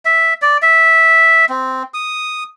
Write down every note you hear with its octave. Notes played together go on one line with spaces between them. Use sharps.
E5
D5
E5
C4
D#6